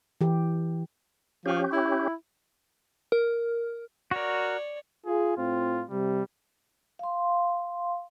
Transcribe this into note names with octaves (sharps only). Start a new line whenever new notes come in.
E3 G4
F3 C#4 G4
E4
A#4
F#4 A#4 C#5 D5
F4 G#4
A2 C4 F4
C3 G3
F5 C6